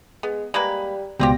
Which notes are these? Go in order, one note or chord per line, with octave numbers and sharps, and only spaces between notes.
G#3 B3
G3 G#3 A#3 B4
C#2 B2 G3 C4 F4 G4 A#6